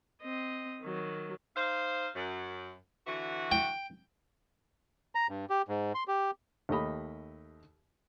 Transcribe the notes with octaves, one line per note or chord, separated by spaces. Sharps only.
C4 D#5
D#3 F#3
D#4 C5 F5
F#2
D3 E3 F#4
G5
A#5
G2
G4
G#2
C6
G4
D#2 A3 G4 D#5 B5